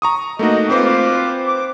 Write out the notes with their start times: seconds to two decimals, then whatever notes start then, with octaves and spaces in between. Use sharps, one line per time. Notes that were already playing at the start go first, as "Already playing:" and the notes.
0.02 A#5 C#6 D#6
0.39 A3 A#3 D#4 F#4 D#5
0.69 C4 F4 B4 C5 D6
1.47 D6